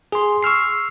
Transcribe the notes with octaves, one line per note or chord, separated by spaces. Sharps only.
G#4 C6
C#6 E6 F6 C7